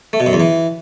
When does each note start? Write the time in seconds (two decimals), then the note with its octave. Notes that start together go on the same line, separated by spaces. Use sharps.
0.13 A3
0.20 B2
0.27 F#2
0.33 E2
0.40 E3